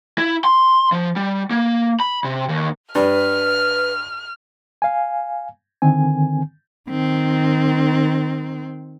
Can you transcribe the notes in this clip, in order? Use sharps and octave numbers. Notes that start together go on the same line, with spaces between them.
E4
C6
F3
G3
A#3
B5
C3
D#2
G2 B4 F6
F5 G#5
D3 D#3 C4 G#5
D#3 C4